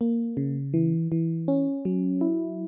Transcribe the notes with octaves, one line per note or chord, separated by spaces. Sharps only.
A#3
C#3
E3
E3
C#4
F#3
E4